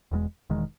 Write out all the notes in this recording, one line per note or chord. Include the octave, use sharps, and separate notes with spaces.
E1 E2 D#3 G#3
E1 E2 D#3 G#3